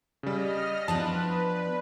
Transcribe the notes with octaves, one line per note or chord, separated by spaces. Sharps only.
C#3 G3 D#5 F6
F3 B3 D4 B4 A5